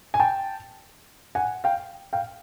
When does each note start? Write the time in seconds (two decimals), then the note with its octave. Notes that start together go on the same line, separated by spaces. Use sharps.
0.14 G#5
0.20 G5 A5
1.35 F#5 G#5
1.64 F5 G5
2.13 F5 G5